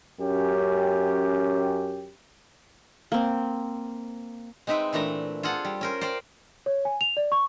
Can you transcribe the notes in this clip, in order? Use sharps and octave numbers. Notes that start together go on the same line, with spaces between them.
F#2 C#4 G4
A#3 C4
G#3 C4 D#4 B4 E5 G5
A#2 E3 A3 D4 A#5
F4 G#4 A4 F#5
G3
C#4 A#4 C5
C5 D5 F5 G5
C#5
G#5
F7
D5
C#6